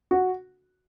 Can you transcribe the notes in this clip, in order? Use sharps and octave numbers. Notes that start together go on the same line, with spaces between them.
F#4